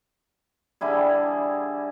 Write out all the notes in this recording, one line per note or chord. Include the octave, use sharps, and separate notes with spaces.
D3 G3 E4 G#4